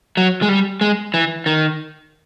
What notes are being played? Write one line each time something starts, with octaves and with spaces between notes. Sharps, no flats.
F#3
G#3
G3
G#3
E3
D#3